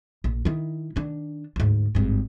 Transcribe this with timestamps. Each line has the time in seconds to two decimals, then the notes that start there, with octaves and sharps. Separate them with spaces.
0.24 A#1
0.45 D#3 E4
0.96 D#3 D4
1.56 D2 G#2
1.95 G#1 G2